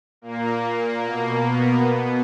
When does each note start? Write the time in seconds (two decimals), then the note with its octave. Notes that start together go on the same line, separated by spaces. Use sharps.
0.22 A#2 A#3
1.01 B2 A#3
1.40 B3
1.80 B2